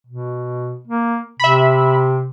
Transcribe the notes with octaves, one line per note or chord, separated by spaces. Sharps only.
B2
A#3
C3 E5 B5